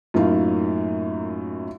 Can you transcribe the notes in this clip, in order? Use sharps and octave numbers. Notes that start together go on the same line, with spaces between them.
F#2 A2 F#3 A#3 D#4 F4